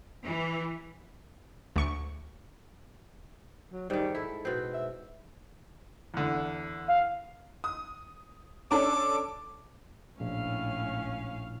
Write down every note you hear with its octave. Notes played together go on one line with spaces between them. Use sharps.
E3
D2 C#6
F#3
G#2 D#3 G3
E4 A4
B2 C4
E5
E2 D3
F5
D#6
C#4 D4 A4 D6
A#1 A2 C#4 F5